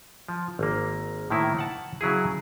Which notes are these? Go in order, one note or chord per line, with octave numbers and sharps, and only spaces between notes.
F3
G#1 A#3
A2 D#3 A#3 E4
F#5 A5
C#3 F#3 E4 G#4